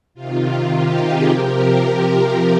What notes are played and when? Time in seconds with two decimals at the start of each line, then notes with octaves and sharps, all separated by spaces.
0.14 C3 D#3 F4
0.71 D#4 G4
1.00 F4 G#4
1.28 C3 F3 G4 A#4